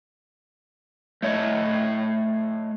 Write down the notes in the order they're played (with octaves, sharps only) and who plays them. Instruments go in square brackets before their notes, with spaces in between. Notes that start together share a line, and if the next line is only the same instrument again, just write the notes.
[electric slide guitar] A3 C#5 D#5